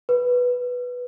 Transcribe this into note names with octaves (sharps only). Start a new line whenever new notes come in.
B4